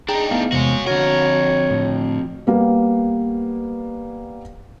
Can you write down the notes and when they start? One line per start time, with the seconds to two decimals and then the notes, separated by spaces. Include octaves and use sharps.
0.08 D4 D#4 G#4 G5 A#5
0.31 A3 B3 E4 G#4 F5
0.52 E2 C3 G#3 C#4 F#4 C5
0.87 F2 D3 F#4 A#4 C#5 F#5
1.70 A2 D3
2.47 G3 A#3 B3